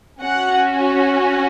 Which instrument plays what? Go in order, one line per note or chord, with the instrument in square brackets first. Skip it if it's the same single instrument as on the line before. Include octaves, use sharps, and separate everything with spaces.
[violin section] C#4 F#4 F#5